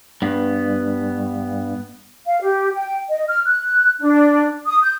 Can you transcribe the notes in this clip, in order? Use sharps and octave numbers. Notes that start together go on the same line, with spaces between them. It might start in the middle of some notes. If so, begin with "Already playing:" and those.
G2 B3
F5
G4
G5
D#5
F6
F#6
D4
D#6
G6